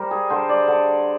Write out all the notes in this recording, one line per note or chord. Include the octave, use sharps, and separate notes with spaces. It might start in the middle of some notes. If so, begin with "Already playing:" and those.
Already playing: G3 A#4 C5
G#4
D3 C5
D5
D3